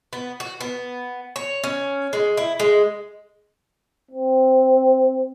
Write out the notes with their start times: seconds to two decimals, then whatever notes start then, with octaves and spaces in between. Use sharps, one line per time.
0.13 B3
0.40 F#4
0.61 B3
1.36 C#5
1.64 C#4
2.13 G#3
2.37 E4
2.60 G#3
4.11 C4